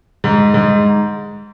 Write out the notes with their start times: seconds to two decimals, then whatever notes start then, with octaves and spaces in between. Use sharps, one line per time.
0.24 G#2
0.54 G#2